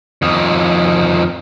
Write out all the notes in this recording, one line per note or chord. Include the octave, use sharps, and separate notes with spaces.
F2 D#3